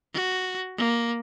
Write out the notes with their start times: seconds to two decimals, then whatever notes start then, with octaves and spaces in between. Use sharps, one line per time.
0.14 F#4
0.78 A#3